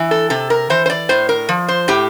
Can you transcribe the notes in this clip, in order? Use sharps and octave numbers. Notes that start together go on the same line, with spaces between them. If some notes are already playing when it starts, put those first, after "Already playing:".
Already playing: E3
A4
C3 A4
A#4
E3 C5
C5
D5
A2 C5
A#4
F3
C5
A2 G4